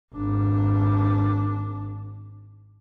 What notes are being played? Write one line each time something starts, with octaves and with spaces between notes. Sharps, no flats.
G#1 D4